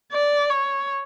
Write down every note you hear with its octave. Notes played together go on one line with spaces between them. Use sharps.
D5
C#5